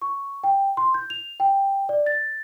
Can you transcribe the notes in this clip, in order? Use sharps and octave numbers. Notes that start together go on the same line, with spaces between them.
C#6
G5
C6
G6
F7
G5
D5
A6